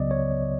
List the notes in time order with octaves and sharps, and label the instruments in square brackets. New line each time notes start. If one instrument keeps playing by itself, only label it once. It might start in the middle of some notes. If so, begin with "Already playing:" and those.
Already playing: [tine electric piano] C#2 C#3 F#3 B3 D5 D#5
C#5